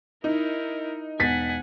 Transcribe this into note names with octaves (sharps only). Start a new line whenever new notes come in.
D#4 E4 A#4
E1 F#5 G#5 A6 B6